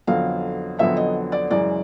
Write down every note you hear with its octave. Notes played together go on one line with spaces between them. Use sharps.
F2 D3 F#3 B3 F5
F2 D3 F#3 B3 E5
D#5
D5
F#2 C#3 E3 G#3 D5